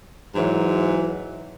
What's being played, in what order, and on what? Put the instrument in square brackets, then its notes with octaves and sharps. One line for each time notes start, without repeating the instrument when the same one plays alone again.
[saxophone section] G#2 E3 F#3